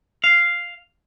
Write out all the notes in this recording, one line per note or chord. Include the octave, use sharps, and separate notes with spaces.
F5